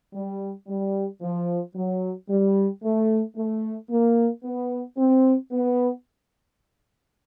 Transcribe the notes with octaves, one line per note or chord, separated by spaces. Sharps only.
G3
G3
F3
F#3
G3
A3
A3
A#3
B3
C4
B3